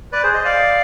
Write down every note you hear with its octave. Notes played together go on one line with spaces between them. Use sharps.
B4 D5
G#4 C5
C5 D#5
D5 F5